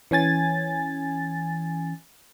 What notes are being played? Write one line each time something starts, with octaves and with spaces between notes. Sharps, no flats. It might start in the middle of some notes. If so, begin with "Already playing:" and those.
E3 C#4 G#5 A6